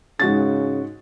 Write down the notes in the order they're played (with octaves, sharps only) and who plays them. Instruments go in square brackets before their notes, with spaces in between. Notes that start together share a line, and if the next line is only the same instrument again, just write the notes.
[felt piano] G#2 F#4 A6 [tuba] C#3